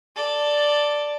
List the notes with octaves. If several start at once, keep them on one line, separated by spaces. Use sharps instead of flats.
A4 D5